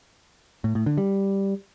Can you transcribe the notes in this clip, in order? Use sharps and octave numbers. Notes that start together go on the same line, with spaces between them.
A2
A2
D3
G3